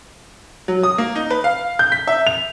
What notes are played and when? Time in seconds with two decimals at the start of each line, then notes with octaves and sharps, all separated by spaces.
0.68 F#3
0.83 D#6
0.98 A#3
1.15 D#4
1.31 B4
1.44 F5
1.79 G6
1.92 B6
2.08 E5
2.27 F7